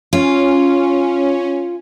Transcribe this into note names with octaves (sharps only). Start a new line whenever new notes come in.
C#4 F4